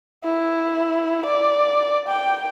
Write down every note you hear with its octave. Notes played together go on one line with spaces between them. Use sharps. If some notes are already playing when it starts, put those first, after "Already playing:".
E4
D5
G5